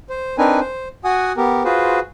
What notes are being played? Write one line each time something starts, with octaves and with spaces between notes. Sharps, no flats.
C5
C4 D4 D#4 A#4 B4 G#5
C5
F#4 F#5 G#5 D#6
B3 G4 A#4
F4 F#4 G#4 B4 C5